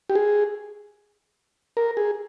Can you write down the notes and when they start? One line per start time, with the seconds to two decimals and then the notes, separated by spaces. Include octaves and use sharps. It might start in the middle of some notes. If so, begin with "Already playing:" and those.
0.10 G4
0.15 G#4
1.77 A#4
1.97 G#4